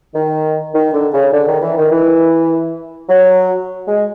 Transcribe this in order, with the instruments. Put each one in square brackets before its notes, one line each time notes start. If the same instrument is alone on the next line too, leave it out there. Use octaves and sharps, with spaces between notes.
[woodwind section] D#3
D#3
D3
C#3
D3
D#3
E3
D#3
E3
F#3
G#3